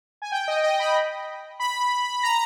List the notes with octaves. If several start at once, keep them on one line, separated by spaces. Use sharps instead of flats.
G#5
G5
D#5
D#5
B5
B5
A#5